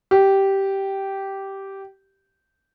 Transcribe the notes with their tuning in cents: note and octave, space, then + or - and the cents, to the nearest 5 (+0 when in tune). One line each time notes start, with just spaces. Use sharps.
G4 -10